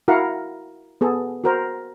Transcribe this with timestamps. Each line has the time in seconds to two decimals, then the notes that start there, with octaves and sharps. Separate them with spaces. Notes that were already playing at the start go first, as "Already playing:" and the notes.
0.08 E4 F#4 A#4 F5 F#5
1.01 B3 G#4 A4
1.44 F#4 A#4 C5